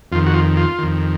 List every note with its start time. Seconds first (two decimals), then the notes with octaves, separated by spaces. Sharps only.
0.12 F2 F4
0.15 D#3
0.26 F#4
0.34 F4
0.57 F4
0.79 F2 D#3